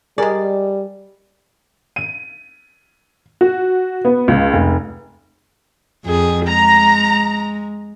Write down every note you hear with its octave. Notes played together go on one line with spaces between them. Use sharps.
G3 G#3 G#4 A#4 D5
D#7
F#4
B3
C#2
F1
F2 G#4
G#3 A#5